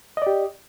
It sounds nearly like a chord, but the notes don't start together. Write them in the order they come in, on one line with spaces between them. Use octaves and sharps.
D#5 D5 G4